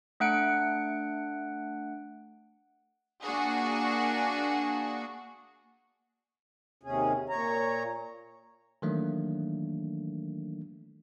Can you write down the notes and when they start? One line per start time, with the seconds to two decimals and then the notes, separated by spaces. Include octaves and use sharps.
0.20 A3 D4 F#5 F#6 C#7 D7
3.23 A#3 D4 F#4 G#4
6.83 D#2 C3 C#4 G#4
7.29 A#2 C#5 A#5
8.82 D#3 E3 F#3 A3 A#3 D4